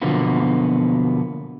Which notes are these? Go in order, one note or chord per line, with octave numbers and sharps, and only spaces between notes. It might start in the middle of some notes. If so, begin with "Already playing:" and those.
B2 D3 F3 F#3 A#3 B3